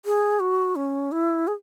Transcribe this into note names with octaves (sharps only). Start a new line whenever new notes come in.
G#4
F#4
C#4
E4
G#4